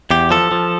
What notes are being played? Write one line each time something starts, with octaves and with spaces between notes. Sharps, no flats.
E2 G4
F3 A4
F3